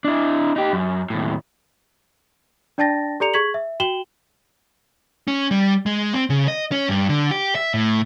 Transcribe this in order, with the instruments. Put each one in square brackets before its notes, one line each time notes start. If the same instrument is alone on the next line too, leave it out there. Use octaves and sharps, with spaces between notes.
[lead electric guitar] D4 E4
D#4 G4
F#2
D#2 A2
[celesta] D4 D5 G5 A5 A6 A#6
G4 A4 D5 A#5 C#7 F7
G#4 C#6 G#6 B6 F#7
E5
F#4 G5 E7 F#7 G7
[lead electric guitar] C#4
G3
G#3
C4
C#3
D#5
C#4
G2
D3
G4
E5
A2